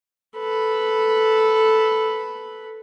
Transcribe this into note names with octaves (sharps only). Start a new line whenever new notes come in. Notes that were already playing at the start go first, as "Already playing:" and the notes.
A4 B4